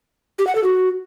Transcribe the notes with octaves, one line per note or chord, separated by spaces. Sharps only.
G4
F#5
A4
F#4